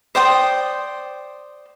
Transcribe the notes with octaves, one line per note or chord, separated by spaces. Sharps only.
C5 D5 G5 D#6